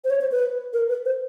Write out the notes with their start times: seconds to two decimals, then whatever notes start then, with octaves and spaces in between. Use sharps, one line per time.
0.04 C5
0.10 C#5
0.21 C5
0.32 B4
0.73 A#4
0.89 B4
1.05 C5